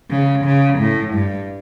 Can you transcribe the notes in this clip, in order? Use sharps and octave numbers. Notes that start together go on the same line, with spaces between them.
C#3
C#3
A2
G2